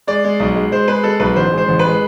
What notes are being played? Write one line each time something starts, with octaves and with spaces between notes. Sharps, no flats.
G#3 D5
G#3
B1
G#3
G#3 C5
G#3 B4
G#3 A4
B1 B4
A1 C5
G#3
C5
A1
B4
G#3